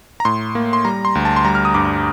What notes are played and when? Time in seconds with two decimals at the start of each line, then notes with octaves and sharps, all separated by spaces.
0.20 A#5
0.25 A2 C6
0.55 A#3
0.73 C6
0.85 G3 A#5
1.05 C6
1.15 D2
1.25 A5
1.36 C6
1.45 G3 A#5
1.55 F6
1.65 D#6
1.74 G2 D6